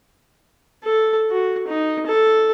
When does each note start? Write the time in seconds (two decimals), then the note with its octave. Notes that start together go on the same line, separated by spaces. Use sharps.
0.85 A4
1.31 F#4
1.68 D#4
2.07 A4